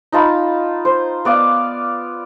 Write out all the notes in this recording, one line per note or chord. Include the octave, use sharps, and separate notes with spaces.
D#4 F4 A5 B5
C5
B3 D5 F5